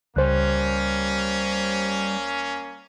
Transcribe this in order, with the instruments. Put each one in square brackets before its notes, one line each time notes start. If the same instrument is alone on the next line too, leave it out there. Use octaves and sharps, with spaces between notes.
[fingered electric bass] C#2 [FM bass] G3 [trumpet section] A#3 C#4 [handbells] C5 F#6